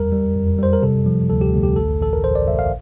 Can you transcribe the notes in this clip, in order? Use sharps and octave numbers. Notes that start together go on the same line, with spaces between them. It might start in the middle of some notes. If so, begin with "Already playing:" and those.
Already playing: E2 G3 A#4
G3
F2
G3 C5
A#4
C3 A4
F3
D2 A4
G4
D2
G4
A1 A4
A1 A4
A#4
A1 C5
D5
A1 E5
F5